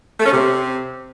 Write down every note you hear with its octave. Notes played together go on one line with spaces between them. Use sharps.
A3
C#4
C3